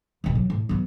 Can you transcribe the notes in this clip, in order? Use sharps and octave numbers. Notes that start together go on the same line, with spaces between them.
E1 A1
F#3
A2
F#3 B3